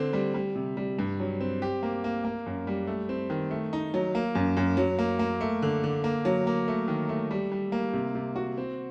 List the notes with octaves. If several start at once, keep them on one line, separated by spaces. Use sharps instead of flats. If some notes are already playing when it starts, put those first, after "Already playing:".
Already playing: D3 C4
G3
G3
C3
G3
G2
F#3
C4
G4
A#3
A#3
A#3
F#2
G3
A3
C4
D#3
A3
D#4
F#3
A#3
F#2
F#2
F#3
A#3
A#3
A3
D3
D3
A#3
F#3
A#3
A3
D#3
A3
G3
G3
A#3
C3
C3
F#4
C4